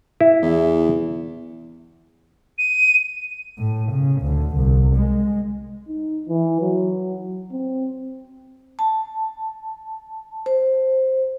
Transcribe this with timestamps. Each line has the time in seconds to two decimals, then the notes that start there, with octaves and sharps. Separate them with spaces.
0.21 E4
0.42 E2
2.58 D#7
3.58 A2
3.92 C#3
4.22 D2
4.57 C2
4.96 G#3
5.88 D#4
6.28 E3
6.62 F#3
7.52 C4
8.79 A5
10.46 C5